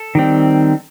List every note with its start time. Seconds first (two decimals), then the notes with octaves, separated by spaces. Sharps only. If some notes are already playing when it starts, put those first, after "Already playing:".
Already playing: A4
0.15 D#3 G3 C4